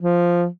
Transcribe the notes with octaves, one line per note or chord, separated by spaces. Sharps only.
F3